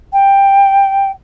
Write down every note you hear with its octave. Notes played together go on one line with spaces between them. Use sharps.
G5